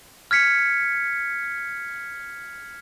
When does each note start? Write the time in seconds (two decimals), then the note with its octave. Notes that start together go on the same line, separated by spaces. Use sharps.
0.31 F6 G#6 B6 C#7